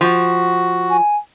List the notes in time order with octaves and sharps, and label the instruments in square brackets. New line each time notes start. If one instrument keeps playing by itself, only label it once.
[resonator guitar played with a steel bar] F3 [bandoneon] F#4
[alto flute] G#5